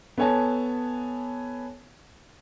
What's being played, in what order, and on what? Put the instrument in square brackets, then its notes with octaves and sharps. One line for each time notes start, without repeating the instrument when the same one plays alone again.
[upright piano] B3 A4 C#5 G#5 A5